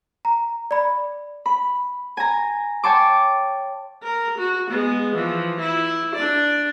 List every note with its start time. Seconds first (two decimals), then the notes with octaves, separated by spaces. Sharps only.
0.25 A#5
0.71 D5 B5
1.46 B5
2.17 G#5 A#5
2.84 C#5 G5 A5 C6 D6
4.02 A#4
4.38 F#4
4.70 G#3 B3
5.15 E3 F3
5.60 E4
6.15 D4 D5